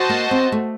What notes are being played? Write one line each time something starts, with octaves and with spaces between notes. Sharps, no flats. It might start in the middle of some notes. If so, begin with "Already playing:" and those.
Already playing: F#4 C5 D#5 A5
A#3
C4
A3